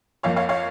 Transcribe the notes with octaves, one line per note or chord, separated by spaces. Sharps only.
F2 F3 A#3 C#5 F5
C#5 F5
C#5 F5